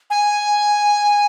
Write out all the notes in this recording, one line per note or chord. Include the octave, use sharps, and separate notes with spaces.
G#5